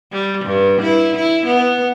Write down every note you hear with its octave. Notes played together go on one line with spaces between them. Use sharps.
G3
G2
E4
E4
B3